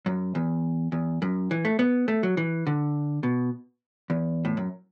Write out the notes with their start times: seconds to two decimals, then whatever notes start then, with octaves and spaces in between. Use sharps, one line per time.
0.06 F#2
0.35 E2
0.92 E2
1.22 F#2
1.51 E3
1.65 A3
1.79 B3
2.08 A3
2.23 F#3
2.37 E3
2.67 D3
3.23 B2
4.10 E2
4.45 A2
4.57 F#2